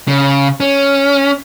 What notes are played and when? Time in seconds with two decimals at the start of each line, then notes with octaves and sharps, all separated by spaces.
0.08 C#3
0.60 C#4